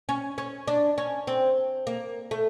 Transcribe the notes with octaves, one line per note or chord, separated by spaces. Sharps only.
C#4
C#4
D4
C#4
C4
A#3
A3